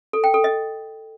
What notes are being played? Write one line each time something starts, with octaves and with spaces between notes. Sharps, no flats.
A4
G5
A4
D#5